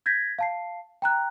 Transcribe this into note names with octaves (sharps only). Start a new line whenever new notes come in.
G6 G#6 A#6 B6
F5 A5 C7
G5 A#5 F#6